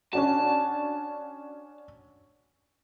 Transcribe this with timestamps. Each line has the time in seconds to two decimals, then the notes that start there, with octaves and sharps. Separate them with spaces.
0.13 C#4 D4 F#4 A5